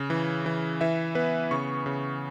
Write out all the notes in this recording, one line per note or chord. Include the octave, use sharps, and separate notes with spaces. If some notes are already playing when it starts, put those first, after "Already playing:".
Already playing: C#3
E3
E3
E3 E5
B3 B4
C#3 C#6
C#3